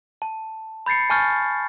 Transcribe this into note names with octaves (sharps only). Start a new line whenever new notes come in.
A5
B5 G6 A6 C7 C#7
G#5 A5 C#6 F6 G6 A6